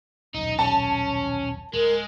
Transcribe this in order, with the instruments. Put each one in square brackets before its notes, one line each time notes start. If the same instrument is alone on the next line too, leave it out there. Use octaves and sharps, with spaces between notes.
[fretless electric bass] D#1 B1 F#2 [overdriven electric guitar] D#4
[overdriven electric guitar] C#4 [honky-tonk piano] A5
[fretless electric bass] D1 [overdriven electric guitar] G#3 [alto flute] A#4